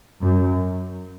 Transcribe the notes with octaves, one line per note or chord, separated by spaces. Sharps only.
F#2